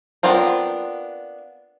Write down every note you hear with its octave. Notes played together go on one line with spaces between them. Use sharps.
B3 C4 D4 F4 A#4